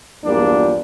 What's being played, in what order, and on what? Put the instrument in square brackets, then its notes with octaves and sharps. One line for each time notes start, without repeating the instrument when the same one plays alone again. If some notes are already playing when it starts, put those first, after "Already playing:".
[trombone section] A#1 E2 G2 A#2 G3 D4